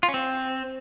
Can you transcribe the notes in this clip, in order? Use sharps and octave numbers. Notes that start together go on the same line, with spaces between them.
F4
C#4
C4